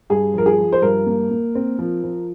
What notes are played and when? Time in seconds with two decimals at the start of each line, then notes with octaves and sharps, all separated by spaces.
0.10 G2 G#4
0.34 F3 A#4
0.46 G#4
0.58 F3
0.72 C5
0.82 G2 A#4
1.07 A#3
1.31 A#3
1.55 C4
1.79 F3
2.04 F3